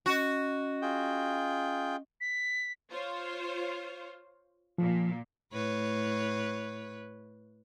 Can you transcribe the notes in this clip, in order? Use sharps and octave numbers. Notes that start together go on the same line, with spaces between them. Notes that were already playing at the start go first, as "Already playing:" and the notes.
C#4 F#4 D#5
F4 G#4 G5
B6
F4 C5 C#5
A#2 F3
A2 B4 C#5